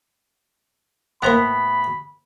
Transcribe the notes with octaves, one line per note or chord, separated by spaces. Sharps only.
A2 A#3 B3 C5 F#5 A#5 B5